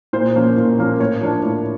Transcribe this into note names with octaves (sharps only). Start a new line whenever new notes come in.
A#2 C5
F3 A#3 C#4
A#2
F3 A#3 C#4
A2 C#5
F3 A#3 D4
A2